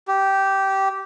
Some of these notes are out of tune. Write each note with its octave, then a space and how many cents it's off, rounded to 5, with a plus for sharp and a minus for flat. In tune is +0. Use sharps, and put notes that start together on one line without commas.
G4 -15